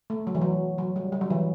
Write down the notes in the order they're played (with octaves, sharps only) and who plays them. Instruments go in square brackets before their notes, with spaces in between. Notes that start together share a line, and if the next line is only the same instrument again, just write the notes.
[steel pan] A3
F#3
E3
F#3
F#3
G3
G3
F#3
E3